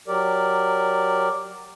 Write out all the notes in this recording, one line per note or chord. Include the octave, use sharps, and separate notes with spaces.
F#3 G4 A#4 D5